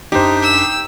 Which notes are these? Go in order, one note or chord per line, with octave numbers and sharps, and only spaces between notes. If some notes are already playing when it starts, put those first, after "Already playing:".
F#2 D4 D#4 G4 C5 B6
E6